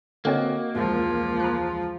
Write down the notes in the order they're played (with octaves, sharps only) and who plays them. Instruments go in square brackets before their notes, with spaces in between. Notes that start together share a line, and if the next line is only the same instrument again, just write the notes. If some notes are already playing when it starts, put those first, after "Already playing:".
[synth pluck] D3 C4 C#5 [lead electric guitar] A#3 [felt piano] F#4 D#5 F#5
[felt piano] E1 C#2 [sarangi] F3
[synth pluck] A#5 F#6